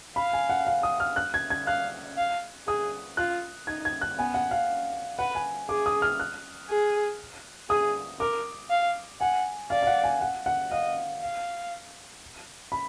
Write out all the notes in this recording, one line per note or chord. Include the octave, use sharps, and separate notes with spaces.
F5 B5
G#5
F#5
F5
D#6
F6
F#6
G#6
G#6
F5 F#6
F5
G#4 D#6
F4 F#6
D#4 G#6
G#6
F#6
B3 G#5
F#5
F5
B4 F#5
G#5
G#4 D6
D#6
F6
F#6
G#4
G#4 D#6
A#4 D6
F5
F#5 G#5
D5 F5
F5
F#5
G#5
F#5
F#5
D#5 F5
F5
B5